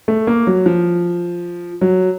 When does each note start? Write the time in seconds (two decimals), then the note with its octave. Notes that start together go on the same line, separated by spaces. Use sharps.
0.08 A3
0.27 A#3
0.47 F#3
0.66 F3
1.81 F#3